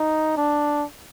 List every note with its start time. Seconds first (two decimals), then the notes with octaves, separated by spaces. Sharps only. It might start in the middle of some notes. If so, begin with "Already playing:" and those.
Already playing: D#4
0.37 D4